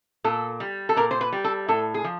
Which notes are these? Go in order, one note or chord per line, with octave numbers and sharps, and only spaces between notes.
A#2 A4
G3
A4
A#2 A#4
C5
B4
G3
A4
A2 A4
G#4
F3